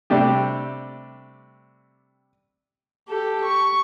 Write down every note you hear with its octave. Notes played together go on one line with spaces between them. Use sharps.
C3 G3 A3 D4 G4
G4 A4
C#6